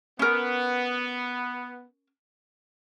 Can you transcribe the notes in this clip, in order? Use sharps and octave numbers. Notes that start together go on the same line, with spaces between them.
B3 C#4 A#4